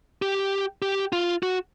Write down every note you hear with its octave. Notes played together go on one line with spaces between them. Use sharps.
G4
G4
F4
F#4